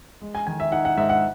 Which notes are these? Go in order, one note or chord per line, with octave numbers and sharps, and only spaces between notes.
G#3
G#5
D#3 G#5
E5
D#4 F#5
F#5
G#2 E5
F#5